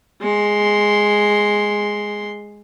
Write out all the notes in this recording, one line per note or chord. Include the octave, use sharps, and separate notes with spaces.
G#3 C6